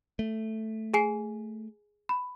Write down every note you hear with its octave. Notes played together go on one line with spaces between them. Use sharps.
A3
G#4 G#5 C7
B5